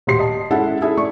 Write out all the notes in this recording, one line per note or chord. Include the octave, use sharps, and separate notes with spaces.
D#1 A2 G4 C6 C7
D#5 A5
G#3 C#4 E4 A4 E5 F#5
E4 G#4 A4 E5
A3 D5 C#6